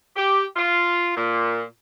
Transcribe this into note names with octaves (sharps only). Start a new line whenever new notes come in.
G4
F4
A#2